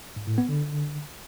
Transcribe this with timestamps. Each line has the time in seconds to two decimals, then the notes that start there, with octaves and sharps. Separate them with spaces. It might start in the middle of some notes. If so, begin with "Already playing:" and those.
0.16 G#2
0.27 A2
0.38 B3
0.49 D3